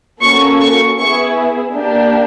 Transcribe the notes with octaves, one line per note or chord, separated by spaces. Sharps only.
A#3 C#4 F#4 A4 C#6
C#6
B3 E4 G#4 C#6
A#3 D4 G4